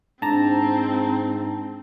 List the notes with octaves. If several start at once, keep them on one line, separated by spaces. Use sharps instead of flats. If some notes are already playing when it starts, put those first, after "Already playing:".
G#2 C4 D4 A5 A#5